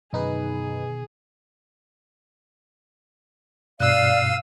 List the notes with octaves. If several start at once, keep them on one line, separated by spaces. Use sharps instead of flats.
F#2 B2 D3 D#3 D#4 G#4 B4
G2 B2 D5 F5 E6 F#6 D#7